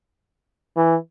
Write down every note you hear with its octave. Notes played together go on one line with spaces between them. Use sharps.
E3